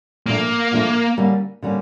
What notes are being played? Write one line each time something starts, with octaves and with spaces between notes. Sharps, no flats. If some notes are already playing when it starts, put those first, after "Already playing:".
A#2 F3 A3 A#3 D4 F4
A#2 F3 A3 D4 F4
D3 G3 A#3 C#4
D3 G3 A#3 C#4